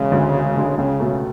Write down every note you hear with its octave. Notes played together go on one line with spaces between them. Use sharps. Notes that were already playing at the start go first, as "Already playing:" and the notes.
Already playing: E1 C#3
D2 D3 G#3
E1
D2 D3 G#3
C#2 C#3
B2 A3